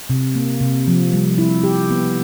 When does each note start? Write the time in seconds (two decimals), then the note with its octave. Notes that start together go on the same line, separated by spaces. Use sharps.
0.10 C3
0.35 A#3
0.61 C3
0.88 F3
1.13 G3
1.38 E4
1.63 G4
1.90 B3